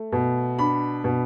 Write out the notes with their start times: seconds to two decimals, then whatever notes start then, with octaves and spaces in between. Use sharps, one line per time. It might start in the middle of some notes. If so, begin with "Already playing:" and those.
Already playing: A3
0.12 B2
0.59 D4 B5
1.04 B2